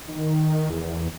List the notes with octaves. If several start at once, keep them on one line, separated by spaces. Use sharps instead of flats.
D#3
E2